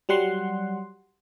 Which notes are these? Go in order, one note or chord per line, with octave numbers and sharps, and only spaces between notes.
F#3 G3 F#5 C6